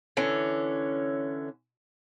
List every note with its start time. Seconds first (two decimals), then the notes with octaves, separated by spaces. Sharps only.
0.17 D3 E3 C#4